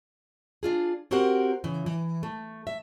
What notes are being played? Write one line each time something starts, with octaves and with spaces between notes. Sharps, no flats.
D4 F4 G#4
C4 F#4 G4 A#4 C5 F#5
C#3 E3
E3
A3
E5